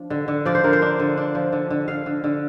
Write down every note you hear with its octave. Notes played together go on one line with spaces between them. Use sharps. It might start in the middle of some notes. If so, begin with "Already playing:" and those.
Already playing: F3 D4
D3
D3
F3 D5
C5
D3 A#4
C5
D4
D3
D4
F3
D3
D3
D3 F5
D3
D3